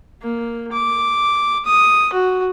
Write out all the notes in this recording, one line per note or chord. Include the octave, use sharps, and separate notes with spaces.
A#3
D6
D#6
F#4